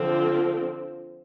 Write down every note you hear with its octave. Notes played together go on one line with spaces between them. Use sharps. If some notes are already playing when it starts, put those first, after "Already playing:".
Already playing: D3 F3 C4